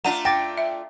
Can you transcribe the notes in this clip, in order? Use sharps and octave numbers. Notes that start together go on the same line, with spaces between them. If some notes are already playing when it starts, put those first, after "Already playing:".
A3 D4 F4 F#5 A#5 D#7
G5 D6 A6 A#6
E5